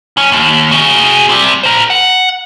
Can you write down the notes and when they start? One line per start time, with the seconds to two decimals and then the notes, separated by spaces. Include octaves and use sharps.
0.17 F2 C#4
0.32 D#2
0.71 F#4 G#4
1.29 G3 C4
1.63 A#4 C5
1.90 F#5